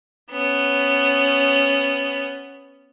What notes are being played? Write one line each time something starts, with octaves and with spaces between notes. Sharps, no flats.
B3 C#4